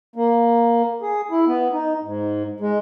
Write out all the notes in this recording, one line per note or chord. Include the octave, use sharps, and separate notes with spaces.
A#3
G#4
E4
B3
D#4
G#2
G#3